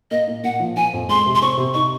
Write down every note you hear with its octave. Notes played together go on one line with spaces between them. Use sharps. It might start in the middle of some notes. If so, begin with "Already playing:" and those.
A#3 D#5
A#2
A#2 F#5
F3
F3 G#5
F2
G#3 C6
C3
C6
C4 C#6
C3
D#4 C#6